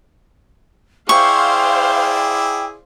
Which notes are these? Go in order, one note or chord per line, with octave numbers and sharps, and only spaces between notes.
E4 G#4 C5 D5 F5 G5 C#6